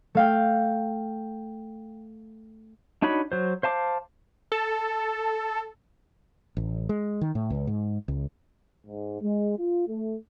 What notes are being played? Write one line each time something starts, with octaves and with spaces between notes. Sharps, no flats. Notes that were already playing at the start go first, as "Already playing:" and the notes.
A3 F5 G5
D4 D#4 F#4 C#5 B5
F#3 C5
C5 F5 A5 D6
A4
A1
G#3
D#3
A2
C#2
G#2
C#2
G#2
G#3
F4
A3